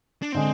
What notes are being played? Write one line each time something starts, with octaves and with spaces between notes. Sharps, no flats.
D4
D3 G#3 C4